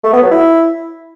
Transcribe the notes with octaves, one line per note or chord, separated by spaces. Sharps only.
A3
B3
F#3
E4